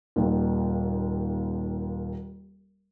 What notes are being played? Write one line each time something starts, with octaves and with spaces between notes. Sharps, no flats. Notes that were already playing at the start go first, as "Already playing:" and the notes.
D#1 D#2